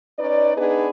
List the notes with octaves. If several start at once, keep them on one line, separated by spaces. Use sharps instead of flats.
C#4 D#4 B4 D5
B3 D4 D#4 G#4 B4